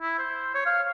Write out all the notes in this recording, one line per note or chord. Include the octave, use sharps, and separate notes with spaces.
E4
C5
C#5
F5